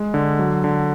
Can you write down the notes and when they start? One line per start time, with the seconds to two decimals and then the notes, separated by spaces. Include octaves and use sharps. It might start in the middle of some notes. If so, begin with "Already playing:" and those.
Already playing: G#3
0.14 D3
0.39 F#3
0.64 D3